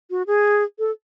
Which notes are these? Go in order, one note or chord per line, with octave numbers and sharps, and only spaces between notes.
F#4
G#4
A4